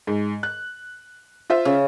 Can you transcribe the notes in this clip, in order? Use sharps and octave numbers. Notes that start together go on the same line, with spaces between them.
G#2
F#6
F4 C5 E5
C#3